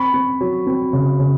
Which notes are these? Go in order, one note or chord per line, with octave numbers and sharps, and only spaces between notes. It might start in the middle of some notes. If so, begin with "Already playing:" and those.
Already playing: C4 B5 C#6
C4
F#3
C4
C#3
C#3